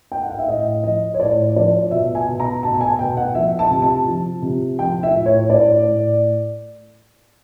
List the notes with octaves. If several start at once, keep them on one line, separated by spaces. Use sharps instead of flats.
G5
F#5
F5
E5
A2 D#5
F3 D#5
C#5
A2 D5
F3 D5
B2 E5
G#5
B2
A#5
B2 A5
A5
G#5
B2 G5
F#5
F3 E5
A5
C3
A5
F3
C3
F3 G5
E5
A2
C#5
A2 D5
A2